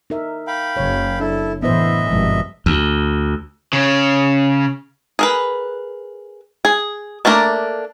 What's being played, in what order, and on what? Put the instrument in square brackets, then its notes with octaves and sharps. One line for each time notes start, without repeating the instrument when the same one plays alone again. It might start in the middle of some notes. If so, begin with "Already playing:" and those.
[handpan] D#4 A#4 E5
[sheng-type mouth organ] F5 G5 B5
[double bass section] F#1 [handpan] C#3 C#5
[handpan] D4 [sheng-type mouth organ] E4 A4
[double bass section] A2 E3 [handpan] B3 E4 C5 [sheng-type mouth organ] D#5 E5
[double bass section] G#1 G2 [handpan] B2 F3 G#3
[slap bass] D2
[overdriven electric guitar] C#3
[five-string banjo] G#4 A#4 B4
G#4
A3 A#3 D4 A#4